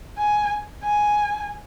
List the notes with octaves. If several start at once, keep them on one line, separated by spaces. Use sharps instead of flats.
G#5
G#5